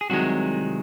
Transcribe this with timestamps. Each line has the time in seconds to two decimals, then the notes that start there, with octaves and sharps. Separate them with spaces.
0.01 G#4
0.10 C2 C3 D#3 F#3 G#3 F#4